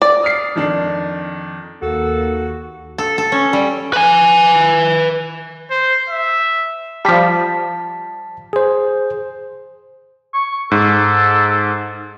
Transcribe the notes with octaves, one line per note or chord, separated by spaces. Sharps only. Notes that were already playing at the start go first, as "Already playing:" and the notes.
D5
D#6 F6 C7
F2 D#3 D4
D#2 A#3 F#4 A4
A4
A4
C#4
G3
B4 G#5
C5
E5
F3 G3 A5 B6
G#4 C5
C#6
G#2 A4